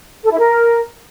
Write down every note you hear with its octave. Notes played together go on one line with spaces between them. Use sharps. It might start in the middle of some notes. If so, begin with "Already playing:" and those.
A4
E4
A#4